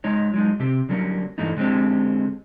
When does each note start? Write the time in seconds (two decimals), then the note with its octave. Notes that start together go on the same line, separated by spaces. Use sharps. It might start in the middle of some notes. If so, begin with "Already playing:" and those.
0.04 G#3 D#4 C#5
0.34 F#3 G#3 D#4
0.60 C3 C4 G4
0.89 D3 F#3 G3 A#3 C#4
1.38 G2 E3 A3 A#3 D#4
1.57 D3 G#3 C4 C#4 G4